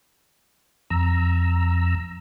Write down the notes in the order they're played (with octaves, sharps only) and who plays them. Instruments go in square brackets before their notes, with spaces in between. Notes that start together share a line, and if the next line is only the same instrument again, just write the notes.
[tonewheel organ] F2 A#5 E6